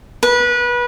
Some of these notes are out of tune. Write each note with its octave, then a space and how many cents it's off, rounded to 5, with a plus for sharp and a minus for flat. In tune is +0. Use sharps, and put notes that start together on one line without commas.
B4 -25